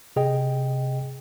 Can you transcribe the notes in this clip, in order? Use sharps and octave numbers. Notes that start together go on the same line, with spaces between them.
C3 G#4 D#5 G5